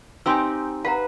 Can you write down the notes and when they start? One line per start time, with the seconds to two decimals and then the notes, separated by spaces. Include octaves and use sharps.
0.26 C4 D#4 G4 G#5 C6 E6
0.85 B4 F5 F#5 A#5